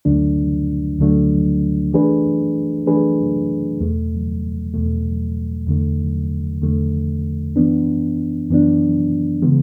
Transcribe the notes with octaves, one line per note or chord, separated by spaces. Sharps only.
D2 D3 F#3 A3 D4
D2 D3 F#3 A3 D4
E3 A3 D4 G#4 B4
E3 A3 D4 G#4 B4
E2 B2 A3
E2 B2 A3
E2 D3 A3
E2 D3 A3
F#2 E3 B3 D4
F#2 E3 B3 D4
C#3 E3 G#3 B3